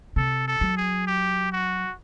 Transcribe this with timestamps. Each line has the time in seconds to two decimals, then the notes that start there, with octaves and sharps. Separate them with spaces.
0.16 C3 A4
0.47 A4
0.61 F#3
0.77 G#4
1.07 G4
1.52 F#4